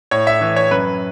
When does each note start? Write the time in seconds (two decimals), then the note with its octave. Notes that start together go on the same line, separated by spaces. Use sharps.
0.11 A2 C#5
0.27 E5
0.41 E3
0.56 C#5
0.71 F#2 B4